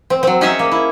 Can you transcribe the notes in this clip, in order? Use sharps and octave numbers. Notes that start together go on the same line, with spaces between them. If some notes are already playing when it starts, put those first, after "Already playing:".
C4
F#3 C4
C#4 D#4 G#4 C#5 E5
A#3
E4